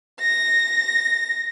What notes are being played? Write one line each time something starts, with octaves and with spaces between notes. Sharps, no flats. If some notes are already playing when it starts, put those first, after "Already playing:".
A#6